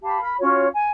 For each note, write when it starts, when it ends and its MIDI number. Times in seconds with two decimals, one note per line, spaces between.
0.03 0.20 67
0.03 0.20 77
0.03 0.20 81
0.03 0.20 83
0.21 0.34 70
0.21 0.34 83
0.39 0.67 61
0.39 0.67 65
0.39 0.67 66
0.39 0.67 73
0.73 0.91 80